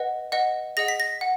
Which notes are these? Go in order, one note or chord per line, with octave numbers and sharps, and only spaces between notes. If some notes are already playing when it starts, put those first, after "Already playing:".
Already playing: B4 D#5 F#5
B4 D#5 F#5
G#4 D#5 F#5 A#6
B6
A#6
F#5